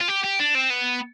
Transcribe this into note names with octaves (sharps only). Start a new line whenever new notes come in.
F4
G4
G4
D4
C4
B3